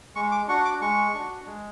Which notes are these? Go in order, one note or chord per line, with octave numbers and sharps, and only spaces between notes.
G#3 C#6
D6
D4 F#4 C#6
D6
G#3 C#6
D4 F#4
G#3